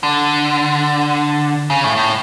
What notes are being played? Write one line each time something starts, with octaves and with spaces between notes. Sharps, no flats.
D3
C#3
A2
A2